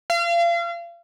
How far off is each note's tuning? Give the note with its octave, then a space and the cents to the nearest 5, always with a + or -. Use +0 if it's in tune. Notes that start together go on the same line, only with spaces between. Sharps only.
F5 -35